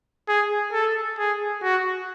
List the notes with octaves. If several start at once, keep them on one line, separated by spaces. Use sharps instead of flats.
G#4
A4
G#4
F#4